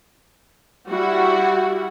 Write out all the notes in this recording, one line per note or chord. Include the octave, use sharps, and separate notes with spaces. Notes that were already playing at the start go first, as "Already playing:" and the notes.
G3 E4 F#4